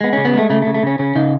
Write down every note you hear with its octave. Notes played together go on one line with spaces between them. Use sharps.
G#3 B3
C#3 C#4
B3
G#3 A3
C#3 A3
A3
C#3
A3
C#3 C#4
C#3 C#4
C#3 D#4